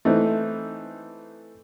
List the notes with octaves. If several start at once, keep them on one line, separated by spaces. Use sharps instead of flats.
E3 A3 C4 D#4